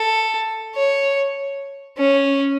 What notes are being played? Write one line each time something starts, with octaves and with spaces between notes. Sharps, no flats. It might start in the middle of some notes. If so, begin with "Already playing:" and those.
Already playing: A4
C#5
C#4